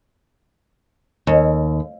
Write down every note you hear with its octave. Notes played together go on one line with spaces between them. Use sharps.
D#2